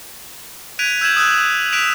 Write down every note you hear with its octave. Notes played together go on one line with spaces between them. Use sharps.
F#6 G#6 B6 D7 D#7 F7
E6 G6 G#6 E7 F#7
D#6 E6 F#6
F#6 B6 D7 E7 F7